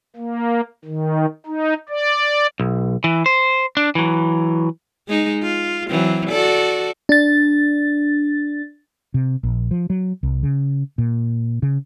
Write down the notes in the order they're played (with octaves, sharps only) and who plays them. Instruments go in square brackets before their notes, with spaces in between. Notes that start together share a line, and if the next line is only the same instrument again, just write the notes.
[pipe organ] A#3
D#3
D#4
D5
[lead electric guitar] B1
E3
C5
D4
E3 F#3
[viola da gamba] G#3 D#4
F4
E3 F#3 C4
F#4 A4 D5
[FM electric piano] D4 A6
[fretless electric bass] C3
A#1
F3
F#3
C2
C#3
A#2
C#3